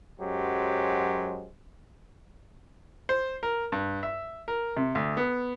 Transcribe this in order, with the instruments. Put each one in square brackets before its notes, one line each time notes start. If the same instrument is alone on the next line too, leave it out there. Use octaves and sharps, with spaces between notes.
[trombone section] F#2 F#3 G#3 G4 C5
[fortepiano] C5
A#4
G2
E5
A#4
C3
D2
B3